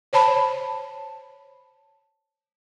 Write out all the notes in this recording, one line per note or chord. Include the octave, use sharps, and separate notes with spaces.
C5 C#5 A5 B5